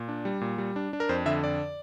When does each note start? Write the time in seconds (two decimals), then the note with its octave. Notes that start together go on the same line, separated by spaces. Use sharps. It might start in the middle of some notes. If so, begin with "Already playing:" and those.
Already playing: A#2
0.08 D4
0.25 G3
0.41 A#2
0.58 G3
0.76 D4
0.93 D4
1.00 A#4
1.09 F2 C5
1.26 D3 E5
1.42 F2 D5